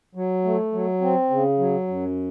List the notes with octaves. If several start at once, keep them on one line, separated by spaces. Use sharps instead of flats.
F#3
A3
F#3
C4
C#3
F#3
F#2